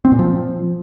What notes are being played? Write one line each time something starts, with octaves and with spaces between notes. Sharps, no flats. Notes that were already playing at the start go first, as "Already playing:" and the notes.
C4
A#2
F3